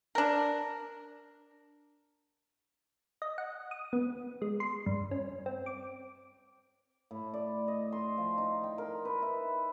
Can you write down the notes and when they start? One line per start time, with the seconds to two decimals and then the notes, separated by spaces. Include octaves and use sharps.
0.15 D4 A#4
3.22 D#5
3.38 F#5
3.71 D#6
3.93 B3
4.42 G#3
4.60 C6
4.86 G2
5.11 C#4
5.46 C4
5.66 D6
7.11 A2
7.34 D5
7.68 D#5
7.92 C6
8.18 F3
8.38 D#4
8.64 G5
8.78 A#4
9.05 B4
9.22 E5